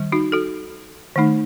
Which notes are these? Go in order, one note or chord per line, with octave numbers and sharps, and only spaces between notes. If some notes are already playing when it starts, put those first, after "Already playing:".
Already playing: D#3 G3
D#4 F#4
F#4 A4
D#3 A3 D#4